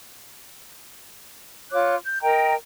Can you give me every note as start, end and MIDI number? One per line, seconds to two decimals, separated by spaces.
1.72 1.94 65
1.72 1.94 73
1.72 1.94 86
1.72 1.94 90
2.04 2.19 91
2.22 2.54 70
2.22 2.54 75
2.22 2.54 79
2.22 2.54 82